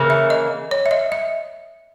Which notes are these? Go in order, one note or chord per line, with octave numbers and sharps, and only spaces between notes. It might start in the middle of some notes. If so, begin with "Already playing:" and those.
Already playing: C#3 E3 A#3
E5
D#5
C#5
E5
D#5
E5